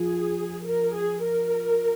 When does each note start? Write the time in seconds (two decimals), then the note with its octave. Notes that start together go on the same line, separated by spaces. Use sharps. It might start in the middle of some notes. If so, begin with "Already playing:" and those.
Already playing: F3 F4 G#4
0.67 A#4
0.96 G#4
1.25 A#4